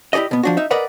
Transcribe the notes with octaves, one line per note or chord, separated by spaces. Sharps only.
E4 G4 A4 D5 D#5
B2 B3
F3 D4 F#4
D#4 E5
A#4 B4 D5 D#5 F#5